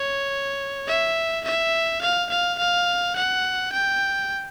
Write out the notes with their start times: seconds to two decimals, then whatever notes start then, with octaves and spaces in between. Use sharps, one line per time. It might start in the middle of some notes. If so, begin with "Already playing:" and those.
Already playing: C#5
0.87 E5
1.45 E5
2.02 F5
2.30 F5
2.59 F5
3.16 F#5
3.73 G5